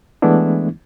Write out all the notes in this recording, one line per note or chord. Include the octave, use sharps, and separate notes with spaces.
E3 G#3 A3 B3 D4 E4